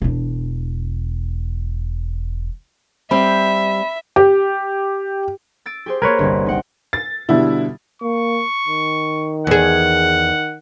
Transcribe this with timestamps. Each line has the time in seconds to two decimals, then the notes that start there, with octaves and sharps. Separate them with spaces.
0.02 E1 D4
3.11 G3 C4 E5 B5
4.16 G4
5.66 E6 A6 D7
5.86 G4 G#4 C5
6.02 A#3 A#4 B4 C#5 C6 G#6
6.19 G1 C2 G3
6.46 D#4 F#5 G5
6.93 A6
7.29 B2 D3 G3 E4
8.02 A#3 C#6
8.67 D#3
9.47 E2 G#4 F#5